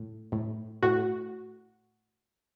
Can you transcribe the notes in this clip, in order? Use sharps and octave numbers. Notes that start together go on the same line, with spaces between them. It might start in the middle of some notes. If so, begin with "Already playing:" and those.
Already playing: A2
A2
A2 F#4